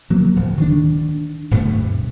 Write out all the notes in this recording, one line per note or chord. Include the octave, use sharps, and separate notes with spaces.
F3 F#3 A#3
D1
D#3 D4
D1 G2 B2 A3